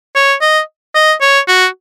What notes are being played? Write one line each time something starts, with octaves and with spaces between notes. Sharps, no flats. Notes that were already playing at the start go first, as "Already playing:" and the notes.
C#5
D#5
D#5
C#5
F#4